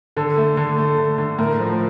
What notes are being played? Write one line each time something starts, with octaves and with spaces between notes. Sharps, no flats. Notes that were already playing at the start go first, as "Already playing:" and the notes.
D3 A4
A3
D3
A3
D3
D3
A2 A#4
F3